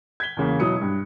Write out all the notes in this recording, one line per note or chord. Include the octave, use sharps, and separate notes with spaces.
G#6 B6 G7
E2 C#3 A#3
B2 F#3 E4 D#6 C#7
G2